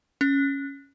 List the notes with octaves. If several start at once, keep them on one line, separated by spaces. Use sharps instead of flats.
C#4